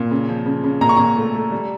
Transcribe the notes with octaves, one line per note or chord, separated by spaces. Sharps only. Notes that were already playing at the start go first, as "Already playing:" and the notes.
Already playing: A#2
C#3
F3
C#3
C#3
A#2 A#5
C#6
A#2 A#5
A3
A3
G3